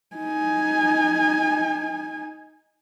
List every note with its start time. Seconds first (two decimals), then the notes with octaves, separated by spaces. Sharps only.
0.16 D#4 G#5